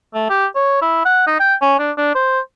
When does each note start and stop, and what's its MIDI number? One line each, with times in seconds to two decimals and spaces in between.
0.14 0.29 57
0.30 0.46 67
0.55 0.80 73
0.82 1.02 64
1.05 1.25 78
1.27 1.35 63
1.40 1.54 79
1.61 1.75 61
1.79 1.91 62
1.97 2.14 62
2.15 2.39 72